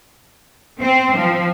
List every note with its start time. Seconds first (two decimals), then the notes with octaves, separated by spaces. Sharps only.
0.81 C4
1.17 F3